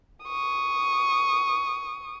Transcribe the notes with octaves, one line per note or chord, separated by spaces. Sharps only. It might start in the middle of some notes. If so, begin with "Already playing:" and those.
C#6 D#6